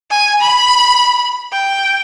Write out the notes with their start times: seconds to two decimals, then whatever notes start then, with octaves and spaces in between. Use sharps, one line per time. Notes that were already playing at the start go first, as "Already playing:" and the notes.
0.11 G#5
0.41 B5
1.52 G5